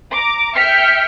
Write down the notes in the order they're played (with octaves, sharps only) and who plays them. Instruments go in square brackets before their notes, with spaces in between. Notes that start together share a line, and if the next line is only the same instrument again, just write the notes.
[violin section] A#5 D6
E5 G5 F6 B6 C#7